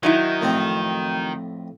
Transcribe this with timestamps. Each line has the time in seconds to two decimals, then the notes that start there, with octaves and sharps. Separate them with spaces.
0.03 D#3 F#3 D#4 E4
0.41 F2 A2 C4